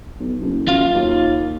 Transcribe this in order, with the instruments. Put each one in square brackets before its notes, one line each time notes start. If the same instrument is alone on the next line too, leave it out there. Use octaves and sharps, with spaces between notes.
[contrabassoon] B1
F#1
[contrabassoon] F#2 [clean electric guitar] F4 F5
[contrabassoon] D#2